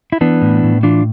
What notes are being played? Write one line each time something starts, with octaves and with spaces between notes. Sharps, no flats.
E4
E3 B3 D4
A2
A2
E3 D4 F4